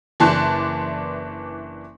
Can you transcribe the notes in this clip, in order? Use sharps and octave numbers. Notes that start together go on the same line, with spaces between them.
F#1 E3 D4 A5 C6 F#6